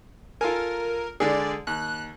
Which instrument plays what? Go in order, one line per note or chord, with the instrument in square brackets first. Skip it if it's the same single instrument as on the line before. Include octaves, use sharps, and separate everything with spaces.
[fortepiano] F4 A4 G#5 [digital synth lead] A#4
[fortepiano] D3 G#3 G#4 [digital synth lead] D5
[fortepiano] D#2 [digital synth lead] F#6